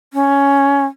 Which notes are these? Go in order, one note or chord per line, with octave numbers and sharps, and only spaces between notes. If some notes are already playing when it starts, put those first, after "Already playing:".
C#4